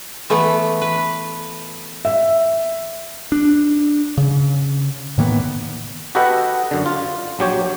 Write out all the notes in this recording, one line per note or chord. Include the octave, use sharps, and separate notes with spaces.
E3 A3 B3
B4
E5
D4
C#3
A2 D#3 A#3 B3
F#4 G4 A4 B4 D#5 F#5
F#2 D3
F4
A#1 F#3 G4 C#5